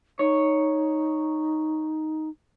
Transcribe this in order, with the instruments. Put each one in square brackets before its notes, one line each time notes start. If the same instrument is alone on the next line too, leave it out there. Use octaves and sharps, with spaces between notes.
[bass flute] D#4 [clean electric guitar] C#5